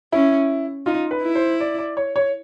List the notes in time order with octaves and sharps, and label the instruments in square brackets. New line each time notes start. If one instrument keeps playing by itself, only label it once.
[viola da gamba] C#4 [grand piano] E4
[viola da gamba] D#4 [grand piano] F4
[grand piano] B4
[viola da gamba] E4
[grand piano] C5
D5
D5
C#5
C#5